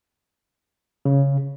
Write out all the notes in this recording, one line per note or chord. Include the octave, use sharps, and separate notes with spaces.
C#3